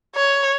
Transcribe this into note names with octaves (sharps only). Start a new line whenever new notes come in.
C#5